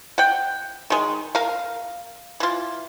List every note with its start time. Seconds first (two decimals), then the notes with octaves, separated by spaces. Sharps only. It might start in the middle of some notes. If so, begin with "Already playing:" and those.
0.18 F#5 G5
0.90 D#3 G#3
1.35 A#4 F5
2.40 E3 F4